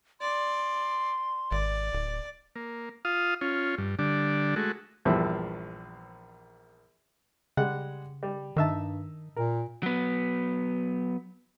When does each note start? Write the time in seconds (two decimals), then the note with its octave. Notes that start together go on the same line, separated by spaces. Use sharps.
0.21 D5 C6
1.52 G#1 D5
1.93 D1
2.56 A#3
3.05 F4 F5 D#6
3.41 C#4 F4
3.78 G2
3.99 D3 G3 D4
4.56 G#3 A3 F#4
5.05 A#1 E2 G2 E3 F3 E5
7.57 C#3 G3 G#3 F#5
8.23 G3
8.56 G2 D#3 D#4 E5 A5
9.36 A#2 A#4
9.83 F#3 B3